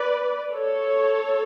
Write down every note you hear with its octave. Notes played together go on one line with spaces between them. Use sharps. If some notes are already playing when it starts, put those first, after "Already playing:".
Already playing: B4 D5
A4 C#5